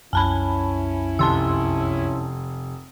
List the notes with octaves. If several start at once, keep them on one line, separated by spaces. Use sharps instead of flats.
C2 F#2 C#4 E4 G#5 A5 B5
F1 A5 C6 E6